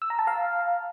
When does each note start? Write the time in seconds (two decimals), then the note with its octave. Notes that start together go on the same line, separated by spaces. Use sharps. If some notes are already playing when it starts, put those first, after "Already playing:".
0.02 E6
0.10 A#5
0.19 A5
0.27 F5